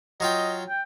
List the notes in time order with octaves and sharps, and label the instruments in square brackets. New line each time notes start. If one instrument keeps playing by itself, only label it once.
[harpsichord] F#3 F4 G5 [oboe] D#5
[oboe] G5